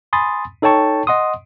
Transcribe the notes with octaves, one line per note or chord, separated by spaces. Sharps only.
G#5 B5 C6 D#6 A6
D#4 A4 C#5 G5 A5 C#6
D#5 F#5 C6 D#6